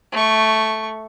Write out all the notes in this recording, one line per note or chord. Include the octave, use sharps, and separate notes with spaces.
A3 C#6